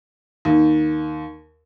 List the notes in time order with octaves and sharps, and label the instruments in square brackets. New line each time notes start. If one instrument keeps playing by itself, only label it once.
[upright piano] D#2